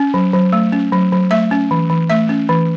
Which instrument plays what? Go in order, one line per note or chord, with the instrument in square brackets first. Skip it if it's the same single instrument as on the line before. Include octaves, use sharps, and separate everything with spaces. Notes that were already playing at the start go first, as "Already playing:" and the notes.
Already playing: [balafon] C#4
F#3
F#3
A3
C#4
F#3
F#3
A3 E5
C#4
E3
E3
A3 E5
C#4
E3